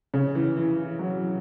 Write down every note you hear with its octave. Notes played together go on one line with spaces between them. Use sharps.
C#3
E3
E3
F#3